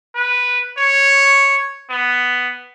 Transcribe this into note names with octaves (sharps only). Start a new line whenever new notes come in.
B4
C#5
B3